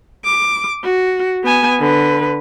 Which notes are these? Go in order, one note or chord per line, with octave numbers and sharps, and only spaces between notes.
D6
F#4
B3 G#5
D3 B4